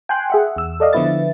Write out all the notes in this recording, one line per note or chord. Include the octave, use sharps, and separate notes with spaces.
G5 G#5 C6 F#6
G#4 E5 F#5
E2 E6
A4 D5 D#5 F5
D3 F3 B3 E4 B4 A6